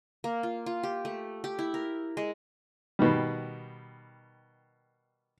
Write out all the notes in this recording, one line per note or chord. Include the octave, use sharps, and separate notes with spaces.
A#3
F4
F4
G4
A3
G4
E4
A#4
G#3
B2 D#3 G3